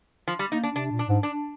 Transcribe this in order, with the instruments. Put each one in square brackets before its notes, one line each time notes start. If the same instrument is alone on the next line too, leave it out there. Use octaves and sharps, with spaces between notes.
[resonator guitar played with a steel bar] F3
G3
[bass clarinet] A#3 [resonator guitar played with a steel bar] D#4
[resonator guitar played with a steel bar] D4
[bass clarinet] C3 [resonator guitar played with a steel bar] D4
[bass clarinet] A#2
[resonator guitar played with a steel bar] D4
[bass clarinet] G#2
[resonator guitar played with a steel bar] D4